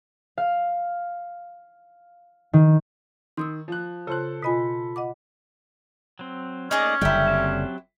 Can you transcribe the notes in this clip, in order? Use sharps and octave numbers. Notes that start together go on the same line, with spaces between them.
F5
D#3
D#3 C6 D#6 E6
F3 F#6
C#3 F4 A4 C5 F#6
B2 F4 D#5 G#5 B5 B6
D#5 F#5 D6
F#3 C4
A3 A#3 C#4 D#4 G#4 D5 D#5
F#1 D3 G3 E4 G4 G5
F#3 C4 A5